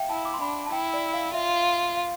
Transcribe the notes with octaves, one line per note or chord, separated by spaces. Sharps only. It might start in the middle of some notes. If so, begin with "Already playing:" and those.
Already playing: E5 F5 G5
E4 A5
D6
C6
D4 B5
A5
E4 G5
D5
F5
F4 E5
F5